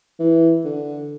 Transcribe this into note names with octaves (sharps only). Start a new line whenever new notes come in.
E3
D3